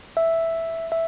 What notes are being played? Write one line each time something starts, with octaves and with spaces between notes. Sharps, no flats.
E5
E5